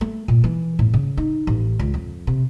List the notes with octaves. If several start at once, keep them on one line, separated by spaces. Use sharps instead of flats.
A3
A#2
E3
A2
C#3
D#4
A1
C#2
F2
C3